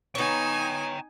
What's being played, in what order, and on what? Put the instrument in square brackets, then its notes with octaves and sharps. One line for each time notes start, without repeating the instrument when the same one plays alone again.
[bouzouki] B3 C#5 [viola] D#4 G#5 [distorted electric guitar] G5 A#5